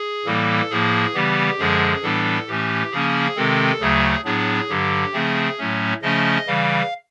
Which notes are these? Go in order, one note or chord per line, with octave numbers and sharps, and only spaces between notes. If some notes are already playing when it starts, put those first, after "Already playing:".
Already playing: G#4
A2 E3 G3 A#3 A4
A2 F3 A#3 G#4
C#3 E3 G3 B3 G4
F#2 D3 F3 G#3 G#4
A2 E3 G3 B3 D4 A4
A2 E3 A3 C#4 G4
C#3 F3 A#3 C#4 G#4
C3 D#3 G#3 C4 A4
D2 C#3 F#3 A3 G#4
A2 F#3 B3 D4 G#4
G2 D3 F#3 G4
C#3 F3 A3 C4 G#4
A2 F#3 A3 C#4
C#3 F3 A3 C#4 D#5
C#3 E3 G3 F5